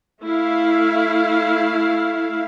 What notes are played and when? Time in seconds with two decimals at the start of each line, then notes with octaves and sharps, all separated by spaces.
0.24 A3 E4 F5